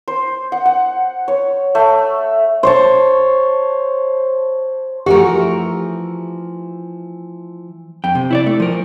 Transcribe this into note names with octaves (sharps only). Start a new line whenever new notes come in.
C5
F#5
F#5
C#5
A3
C5 C#5 A5
E3 F3 A3 F#4 G4 A#4
F2 G5
C3
E4 C#5 D5
A3
F3 A#4